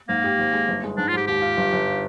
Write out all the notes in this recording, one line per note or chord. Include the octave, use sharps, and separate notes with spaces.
G#2 A#3
G4
G#1
G#3
G1
G#3
G#2 D4
F4
G#2 G4
D#2 G4
F4
G1
G1